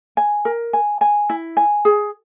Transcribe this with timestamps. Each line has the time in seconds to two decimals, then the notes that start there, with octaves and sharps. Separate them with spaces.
0.17 G#5
0.45 A#4
0.73 G#5
1.01 G#5
1.30 E4
1.57 G#5
1.85 G#4